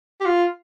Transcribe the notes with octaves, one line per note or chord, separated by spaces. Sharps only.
G4
F4